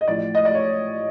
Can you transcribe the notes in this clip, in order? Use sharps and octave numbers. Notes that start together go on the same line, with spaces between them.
D#5
A1 A2 F3 D5
D#5
D5
C#5